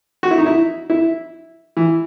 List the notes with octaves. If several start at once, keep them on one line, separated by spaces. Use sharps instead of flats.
F#4
E4
D#4
E4
E4
E3